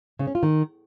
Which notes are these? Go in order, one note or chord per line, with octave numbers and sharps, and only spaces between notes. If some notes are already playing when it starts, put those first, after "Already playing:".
C#3
C#4
F4
D#3